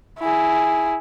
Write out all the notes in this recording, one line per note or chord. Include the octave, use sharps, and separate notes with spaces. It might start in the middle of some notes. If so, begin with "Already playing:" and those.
E4 G#4